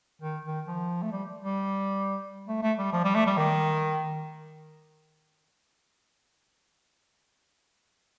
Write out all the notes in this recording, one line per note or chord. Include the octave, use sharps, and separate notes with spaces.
D#3
D#3
F3
A3
G3
G3
A3
A3
G3
F3
G3
A3
G3
D#3